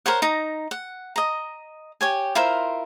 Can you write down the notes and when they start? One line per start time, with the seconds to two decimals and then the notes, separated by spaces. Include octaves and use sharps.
0.06 A#4 C5 C#5 F#5
0.22 D#4 A#5
0.71 F#5
1.16 D#5 A#5
2.01 G4 C#5 G#5
2.35 E4 F4 A#4 C5